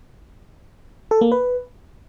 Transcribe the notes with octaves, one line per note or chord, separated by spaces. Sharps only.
A4
A#3
B4